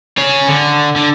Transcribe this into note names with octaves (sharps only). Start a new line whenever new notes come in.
G#4 C#5
D3
D3